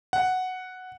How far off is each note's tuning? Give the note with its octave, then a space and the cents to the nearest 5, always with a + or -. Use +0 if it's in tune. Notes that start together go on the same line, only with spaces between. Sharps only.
F#5 +0